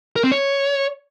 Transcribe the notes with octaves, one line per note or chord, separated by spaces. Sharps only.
A#4
C4
C#5